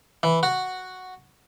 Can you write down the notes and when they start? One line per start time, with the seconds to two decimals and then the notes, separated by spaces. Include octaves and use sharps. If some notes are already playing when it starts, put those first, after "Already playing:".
0.23 E3
0.43 F#4